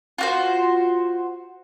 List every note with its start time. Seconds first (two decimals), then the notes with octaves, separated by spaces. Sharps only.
0.18 F4 F#4 C5